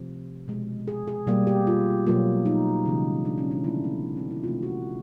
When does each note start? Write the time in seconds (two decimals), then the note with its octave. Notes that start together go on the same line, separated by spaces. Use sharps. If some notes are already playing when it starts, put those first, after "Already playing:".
Already playing: C3 F3 A3
0.48 B2 G#3
0.88 G#4
1.07 G#4
1.27 B2 G3 A#3 G4
1.47 G4
1.67 F4
2.06 B2 F#3 A#3 F4
2.45 D#4
2.86 C#3 E3 G#3
3.25 D4
3.38 C#4
3.51 D4
3.64 D3 F3 A3 E4
3.84 B3
4.17 C4
4.31 E4
4.43 C3 F3 A3 F4
4.63 F#4